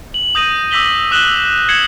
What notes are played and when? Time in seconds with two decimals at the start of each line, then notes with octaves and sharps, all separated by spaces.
0.14 F#7
0.35 D#6 G6 A#6 D#7
0.71 D6 E6 A#6 B6 F#7 G7
1.11 D#6 F#6 E7 F#7 G7
1.27 E6
1.69 G#6 C7 C#7 E7 F#7